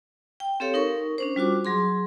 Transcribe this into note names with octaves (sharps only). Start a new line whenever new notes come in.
G5
C4 G4 A4 C#5 F5
D#4 A#4 C#6
C#4 D4 C5
G3 F4 F#4 D6
F#3 G#4 C6